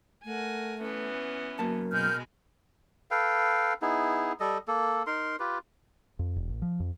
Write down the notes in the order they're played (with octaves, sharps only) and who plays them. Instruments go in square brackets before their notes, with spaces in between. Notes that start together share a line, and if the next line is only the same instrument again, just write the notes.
[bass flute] A3 [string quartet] A#4 F#5 G#5
[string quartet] E3 B3 C#4
[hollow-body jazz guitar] F#2 A#3 A5 [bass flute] A#4
[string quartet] B2 G#3 [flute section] F6 G6
[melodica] A4 B4 F5 G5
B3 D#4 E4 G#4
G3 A4 D#5
A#3 A4
D#4 A#4 C6
F4 G4 B4
[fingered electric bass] F2
E1
A1
F3
F2